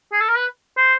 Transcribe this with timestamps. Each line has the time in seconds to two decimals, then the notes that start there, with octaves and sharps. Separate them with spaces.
0.12 G#4
0.20 A4
0.29 A#4
0.37 B4
0.77 C5